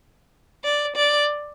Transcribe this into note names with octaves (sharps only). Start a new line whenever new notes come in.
D5
D5